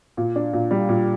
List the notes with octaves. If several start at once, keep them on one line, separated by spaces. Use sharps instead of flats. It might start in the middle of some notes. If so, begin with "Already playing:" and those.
A#2
D4
A#2
G3
A#2